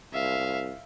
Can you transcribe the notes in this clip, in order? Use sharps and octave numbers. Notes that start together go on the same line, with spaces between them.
C2 E5 F5